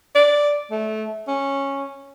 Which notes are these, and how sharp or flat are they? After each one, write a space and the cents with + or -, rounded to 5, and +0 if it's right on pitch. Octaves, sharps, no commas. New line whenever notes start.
D5 +0
A3 -20
C#4 -10